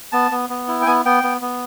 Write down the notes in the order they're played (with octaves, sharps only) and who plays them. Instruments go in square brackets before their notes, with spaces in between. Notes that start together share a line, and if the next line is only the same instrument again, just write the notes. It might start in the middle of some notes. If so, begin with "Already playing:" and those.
[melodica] B3 A5
B3
B3
E4
G5
B3 G#5
B3 G5
B3
B3